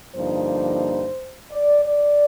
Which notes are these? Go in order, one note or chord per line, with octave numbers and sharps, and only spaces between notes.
G2 D3 F3 A#3 D#4 C5
D5
D5